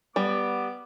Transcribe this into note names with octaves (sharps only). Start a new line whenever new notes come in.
G3 B3 D6